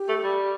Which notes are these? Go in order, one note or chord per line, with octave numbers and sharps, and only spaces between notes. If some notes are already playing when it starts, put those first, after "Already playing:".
Already playing: G4
A3
G3